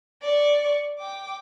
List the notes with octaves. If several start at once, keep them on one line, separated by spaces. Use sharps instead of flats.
D5 C#6
G5 D6